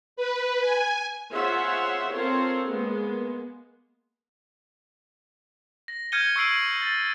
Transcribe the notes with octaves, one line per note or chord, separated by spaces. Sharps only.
B4
G#5
F4 G#4 C5 C#5 E5 F#5
C4 F4 A4 A#4 C5 C#5
G#3 A#3 B3
A#6
F6 G6 G#6 C#7 D#7 G7
C#6 E6 G#6 C7 D7 F#7
A6